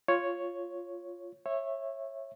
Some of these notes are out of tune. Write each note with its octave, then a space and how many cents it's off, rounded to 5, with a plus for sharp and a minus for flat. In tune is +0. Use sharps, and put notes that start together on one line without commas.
F4 +0 C#5 +0
C#5 -20 E5 +0